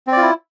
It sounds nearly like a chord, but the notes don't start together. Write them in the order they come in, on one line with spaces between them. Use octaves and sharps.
C4 D5 F4 E4